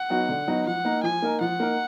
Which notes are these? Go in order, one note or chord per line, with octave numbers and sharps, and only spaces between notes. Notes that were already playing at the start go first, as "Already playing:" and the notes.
Already playing: F#5
F#3 B3 D#4 F#4
D3
F#3 B3 D#4 F#4
F3 F#5
A#3 D#4 A#4
F3 G#5
A#3 D#4 A#4
F3 F#5
A#3 D#4 A#4